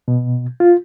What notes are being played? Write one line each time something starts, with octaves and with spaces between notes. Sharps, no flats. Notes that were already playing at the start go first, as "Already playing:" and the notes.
B2
F4